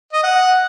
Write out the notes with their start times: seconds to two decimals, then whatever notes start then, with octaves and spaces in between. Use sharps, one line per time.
0.13 D#5
0.23 F#5